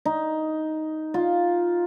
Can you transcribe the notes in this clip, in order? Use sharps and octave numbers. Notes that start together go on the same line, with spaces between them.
D#4
F4